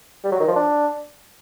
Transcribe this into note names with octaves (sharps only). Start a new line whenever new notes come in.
G3
F#3
D#3
F3
D4